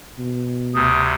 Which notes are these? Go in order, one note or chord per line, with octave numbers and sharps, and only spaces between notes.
B2
D2 C3 D#6